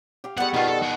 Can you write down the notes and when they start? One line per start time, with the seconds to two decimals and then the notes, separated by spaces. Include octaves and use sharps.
0.24 G4 F5
0.38 G3 G#3 B3 A4 F#5 C#6
0.54 B2 D#3 B3 F4
0.67 A4
0.83 F#4 G#4